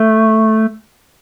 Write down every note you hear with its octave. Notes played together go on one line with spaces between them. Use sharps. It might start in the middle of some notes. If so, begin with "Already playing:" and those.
Already playing: A3